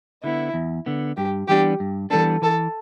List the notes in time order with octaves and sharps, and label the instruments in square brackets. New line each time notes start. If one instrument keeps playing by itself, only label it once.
[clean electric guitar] D3 B3 [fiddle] E4
[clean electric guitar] E2
D3 B3
[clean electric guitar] G2 [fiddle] G4
[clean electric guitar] E3 G3 B3 D4 [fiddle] G4
[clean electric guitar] G2
[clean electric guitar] E3 G3 B3 D4 [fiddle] A4
[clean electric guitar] E3 [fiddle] A4